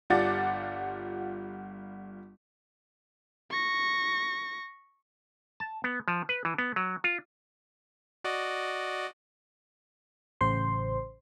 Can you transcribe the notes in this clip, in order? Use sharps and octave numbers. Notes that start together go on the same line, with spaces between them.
G1 G3 F4 F#5 D6 A6
C#6 A#6
A5
B3
F3
B4
E3
B3
F#3
F4
F#4 D5 D#5
A1 C#3 C5 C6